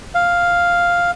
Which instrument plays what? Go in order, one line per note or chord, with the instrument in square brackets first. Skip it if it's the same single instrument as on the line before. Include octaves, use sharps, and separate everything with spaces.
[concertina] F5